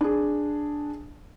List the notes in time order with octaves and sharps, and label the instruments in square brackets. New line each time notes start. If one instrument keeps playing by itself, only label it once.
[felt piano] D4 G#4